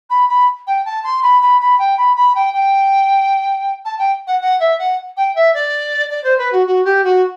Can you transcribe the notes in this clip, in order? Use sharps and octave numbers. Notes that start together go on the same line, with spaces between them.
B5
B5
G5
A5
C6
B5
B5
B5
G5
B5
B5
G5
G5
A5
G5
F#5
F#5
E5
F#5
G5
E5
D5
D5
C5
B4
F#4
F#4
G4
F#4